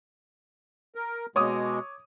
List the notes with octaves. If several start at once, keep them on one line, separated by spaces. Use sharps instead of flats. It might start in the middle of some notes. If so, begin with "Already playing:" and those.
A#4
B2 G#3 C#5 D6 D#6